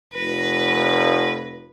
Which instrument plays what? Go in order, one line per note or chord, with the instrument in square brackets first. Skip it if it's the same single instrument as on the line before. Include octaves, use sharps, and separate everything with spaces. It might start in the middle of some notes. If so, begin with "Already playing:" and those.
[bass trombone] F1 [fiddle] B4 [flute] A#6